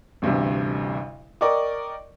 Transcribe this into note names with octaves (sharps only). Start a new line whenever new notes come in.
A1 D2 G2 C3
A#4 D5 D#5 G5 C#6 D6